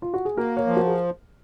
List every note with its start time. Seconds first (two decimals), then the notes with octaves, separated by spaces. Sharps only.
0.02 F4
0.14 F#4
0.25 G#4
0.37 A#3 F#4 A#4
0.57 A#4 C#5
0.67 F3
0.76 F#4 A#4
0.87 G#4